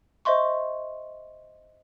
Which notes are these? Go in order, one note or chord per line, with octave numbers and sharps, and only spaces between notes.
C5 D#5 E5 C6 C#6